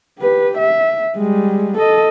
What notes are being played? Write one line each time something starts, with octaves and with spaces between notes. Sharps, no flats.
G4 B4
E5
G3 G#3
A4 D#5